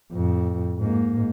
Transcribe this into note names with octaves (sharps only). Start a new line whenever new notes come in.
F2 A2
G#2 A#3